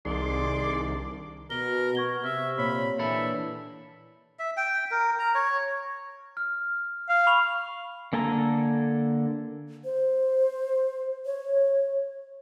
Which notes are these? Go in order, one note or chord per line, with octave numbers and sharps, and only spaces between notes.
C2 D#3 D4 G#4 D5 C6
B2 A#4 G7
B3 C#6 G#6 G7
C3 E5 F6
A#2 C#5 B5
A#2 E3 D4 A4 E5 B5
E5
G5
A#4
A#5
C#5
F6
F5
B5 C#6 F7
D3 A#3 A4 G#5 A#5
C5
C#5